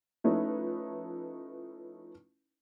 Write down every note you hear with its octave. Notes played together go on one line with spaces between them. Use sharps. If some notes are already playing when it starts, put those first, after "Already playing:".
F3 A3 C#4 D#4 E4 B4